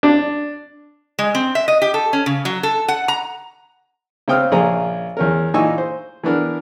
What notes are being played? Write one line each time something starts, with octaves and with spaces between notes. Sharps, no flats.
D4
G#3
C4
E5
D#5
G4
A4
C#4
C#3
F#3
A4
F#5
A#5
C#3 C4 G5 D#6 F6
A#1 C#3 A#3 G#5 A#5
E2 C#4 A#4
A#2 E3 D#4 G#5 C#6 E6
C5
E3 B3 D4 A#4